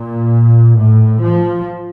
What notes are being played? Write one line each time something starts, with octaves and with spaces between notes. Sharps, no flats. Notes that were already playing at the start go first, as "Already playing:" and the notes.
Already playing: A#2
A2
F3